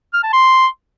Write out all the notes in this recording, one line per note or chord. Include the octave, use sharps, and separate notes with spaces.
F6
A5
C6